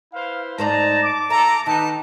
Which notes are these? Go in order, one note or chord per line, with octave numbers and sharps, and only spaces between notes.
E4 B4 C5 F5
G#2 D#4 C5 D5 A5 A#5
D6
A4 E5 A#5
D#3 D#4 A4 B4 A5